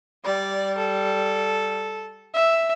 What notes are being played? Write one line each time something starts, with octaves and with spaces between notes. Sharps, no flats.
G3 D5
A4
E5